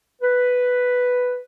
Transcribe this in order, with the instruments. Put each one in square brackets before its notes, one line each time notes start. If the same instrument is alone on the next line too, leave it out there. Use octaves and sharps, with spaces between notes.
[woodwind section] B4